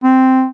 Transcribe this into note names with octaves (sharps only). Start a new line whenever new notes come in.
C4